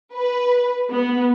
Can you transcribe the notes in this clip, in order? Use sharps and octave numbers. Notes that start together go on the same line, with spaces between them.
B4
B3